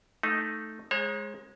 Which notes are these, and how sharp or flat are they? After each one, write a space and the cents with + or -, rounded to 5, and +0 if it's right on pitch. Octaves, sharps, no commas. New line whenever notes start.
A3 +0 D#4 +0
G#3 +0 C#5 -45 A#5 +30